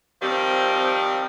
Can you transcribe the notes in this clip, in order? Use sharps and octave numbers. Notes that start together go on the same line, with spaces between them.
D#3 F3 G3 C4